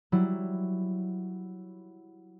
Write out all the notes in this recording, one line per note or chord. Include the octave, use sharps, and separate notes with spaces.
F#3 G3 E4